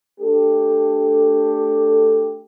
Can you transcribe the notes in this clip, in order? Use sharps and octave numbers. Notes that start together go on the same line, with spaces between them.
A3 D4 G4 A4